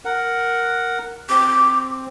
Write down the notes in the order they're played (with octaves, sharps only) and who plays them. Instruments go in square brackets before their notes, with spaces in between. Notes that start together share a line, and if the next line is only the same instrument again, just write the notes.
[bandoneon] A#4 F#5
[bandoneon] C4 [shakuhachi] D6